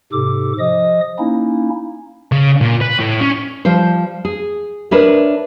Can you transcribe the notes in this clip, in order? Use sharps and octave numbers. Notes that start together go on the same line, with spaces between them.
G#2 C3 G4 A4 D6
F3 D#5 D#6
A#3 C#4 D#4 E4
C#3
A#2
B4
A2
C#4
F3 G3 C5
G#4
D4 A#4 B4 C#5 E5